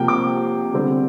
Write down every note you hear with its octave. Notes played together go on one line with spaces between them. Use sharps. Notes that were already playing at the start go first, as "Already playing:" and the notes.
Already playing: C3 F3 A#3 G5
D6
D3 G3 C4